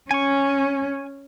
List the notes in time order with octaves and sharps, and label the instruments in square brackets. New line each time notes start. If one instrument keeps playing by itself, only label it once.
[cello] C#4 [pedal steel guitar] G#5 C#6